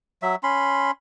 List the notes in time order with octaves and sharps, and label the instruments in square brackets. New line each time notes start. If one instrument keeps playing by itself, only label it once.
[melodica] F#3 E5
C#4 B5 C6